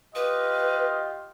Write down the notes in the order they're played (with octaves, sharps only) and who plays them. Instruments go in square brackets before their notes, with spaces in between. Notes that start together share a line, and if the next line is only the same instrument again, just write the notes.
[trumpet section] F4 G4 D#5 [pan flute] B4